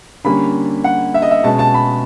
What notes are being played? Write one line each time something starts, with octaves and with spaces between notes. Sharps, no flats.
D3 G3 A#3 C#4 B5
F#5
E5
D#5
E5
B2 G#3 C#4 A5
A5
B5